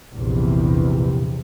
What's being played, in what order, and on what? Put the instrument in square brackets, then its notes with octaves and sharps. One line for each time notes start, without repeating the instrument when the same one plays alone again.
[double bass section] A#1 E2 C3